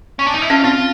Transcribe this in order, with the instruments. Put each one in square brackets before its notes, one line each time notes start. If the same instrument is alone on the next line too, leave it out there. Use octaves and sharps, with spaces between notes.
[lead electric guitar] C#4
D4
D#4
E4
[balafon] C#4 [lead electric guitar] F4
[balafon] C4 [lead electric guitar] F4